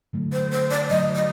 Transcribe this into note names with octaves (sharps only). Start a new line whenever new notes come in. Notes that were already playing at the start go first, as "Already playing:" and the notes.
D3 F#3 A3
C5
C5
D5
D3 F#3 A3 D#5
D#5